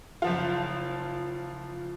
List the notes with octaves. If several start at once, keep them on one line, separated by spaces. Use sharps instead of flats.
F#1 F3 F4